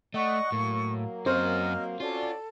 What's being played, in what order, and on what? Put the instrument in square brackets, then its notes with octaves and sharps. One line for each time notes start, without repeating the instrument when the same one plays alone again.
[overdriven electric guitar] A3 [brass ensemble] D5 D#5 F#5 [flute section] C#6
[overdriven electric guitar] A2 [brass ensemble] F#3 A#3
[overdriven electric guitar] F#2 F#4 [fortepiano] C4 [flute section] D#5 F6
[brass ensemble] C#4 F#4 D5 [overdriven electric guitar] F4 [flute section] A4